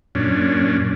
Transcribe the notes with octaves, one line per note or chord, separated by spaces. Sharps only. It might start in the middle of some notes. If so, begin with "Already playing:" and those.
F#2 A#2 C#4 D4